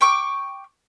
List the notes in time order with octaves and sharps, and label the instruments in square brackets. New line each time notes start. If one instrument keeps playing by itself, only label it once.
[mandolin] G5 C#6 D6